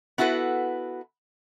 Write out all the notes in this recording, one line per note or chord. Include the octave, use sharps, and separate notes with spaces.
B3 E4 F#4 A4 B4